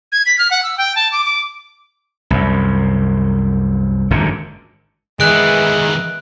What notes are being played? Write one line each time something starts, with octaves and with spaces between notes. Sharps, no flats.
G#6
B6
F6
F#5
E6
G5
A5
D6
D6
C2 F#2
G#1 F#2 A#2 D3
D#3 E3 G#3 B3 F#6 D7